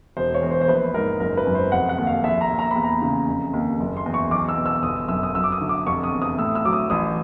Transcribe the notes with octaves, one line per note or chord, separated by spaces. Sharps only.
E1 C5
C#5
E2
C5
C5
A#1 B4
G#2 A#4
F#1 A#4
B4
F#2
C5
F1 F#5
F#5
D#2
F5
A#1 E5
A#5
A#2
A#5
E2 B5
A#5
C#3
F1
D#2
F#1
C6
E2
C#6
B1 D6
E6
B2
E6
G1 D#6
F#2 E6
D#6
F#2 E6
D6
D#6
D3
D6
F1 C#6
D#6
E2
D#6
A2 E6
E6
F#3 D6
D#6
A1 D#6